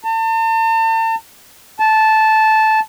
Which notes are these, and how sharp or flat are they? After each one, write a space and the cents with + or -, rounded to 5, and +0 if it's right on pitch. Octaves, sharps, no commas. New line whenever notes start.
A5 +40
A5 -10